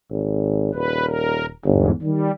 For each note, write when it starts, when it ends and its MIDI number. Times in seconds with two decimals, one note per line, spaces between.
0.10 0.74 32
0.74 1.50 27
0.74 1.05 71
1.06 1.46 70
1.65 1.87 31
1.65 1.90 40
1.65 1.90 44
2.02 2.29 51
2.02 2.31 55